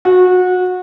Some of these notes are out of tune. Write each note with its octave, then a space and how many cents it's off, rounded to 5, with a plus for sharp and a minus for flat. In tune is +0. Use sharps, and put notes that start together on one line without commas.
F#4 -25